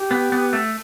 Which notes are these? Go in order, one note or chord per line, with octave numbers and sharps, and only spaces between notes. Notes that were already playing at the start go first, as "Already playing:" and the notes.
Already playing: G4
B3
B3
A3